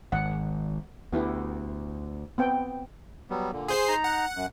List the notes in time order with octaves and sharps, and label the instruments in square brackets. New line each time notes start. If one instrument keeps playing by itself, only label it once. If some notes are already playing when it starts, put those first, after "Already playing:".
[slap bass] G#1 [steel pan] F#5
[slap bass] D2 [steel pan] B3 E4 G4
[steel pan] B3 C4 G5
[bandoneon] F#3 G3 B3
A#2 D3
[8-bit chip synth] G#4 C5 C7
[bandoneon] D#4 A#5
[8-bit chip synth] F#5
[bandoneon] F#2